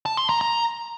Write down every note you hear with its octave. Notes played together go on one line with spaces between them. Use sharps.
A5
C6
A#5
A#5